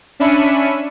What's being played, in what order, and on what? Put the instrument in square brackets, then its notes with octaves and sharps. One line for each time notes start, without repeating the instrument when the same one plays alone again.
[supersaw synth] C#4 D4 E5 B5 C#7 D#7